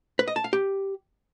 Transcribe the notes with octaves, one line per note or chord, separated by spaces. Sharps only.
B4
D#5
A5
F5
G4